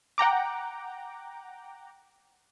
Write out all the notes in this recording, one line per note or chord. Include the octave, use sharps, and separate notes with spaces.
F#5 G5 A#5 D6